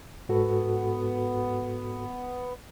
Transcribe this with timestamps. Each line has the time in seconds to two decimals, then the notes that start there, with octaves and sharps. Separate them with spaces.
0.29 G#2 B3 F#4 A4